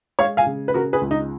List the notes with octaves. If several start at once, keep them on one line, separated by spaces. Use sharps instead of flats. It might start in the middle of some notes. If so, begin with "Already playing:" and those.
G#3 C#5 F5
F5 G#5
C#3
B4
C#3 F#4 A#4
G#4 B4
C#2
D#4